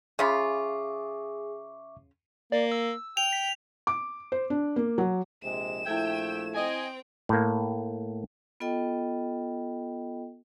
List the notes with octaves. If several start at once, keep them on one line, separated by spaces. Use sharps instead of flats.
C#3 F4 G#4 E5 B5 C#6 D6
A#3 D5
E6
G5 F7
B6
D6
C5
D4
A#3
F#3
A#1 C3 G#3 E7
A#1 F3 A3 E4 E5 G5 G#6
C4 D#5 G5 G#5
A2 A#3
B3 F4 A4 D#5 G5